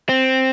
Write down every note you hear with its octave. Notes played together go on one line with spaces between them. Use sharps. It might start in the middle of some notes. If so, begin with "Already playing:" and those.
C4